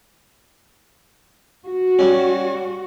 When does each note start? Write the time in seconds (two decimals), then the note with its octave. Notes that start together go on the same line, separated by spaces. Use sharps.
1.67 F#4
1.99 G3 C#4